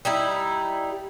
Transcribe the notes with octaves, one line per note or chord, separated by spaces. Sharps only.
G3 D#4 E4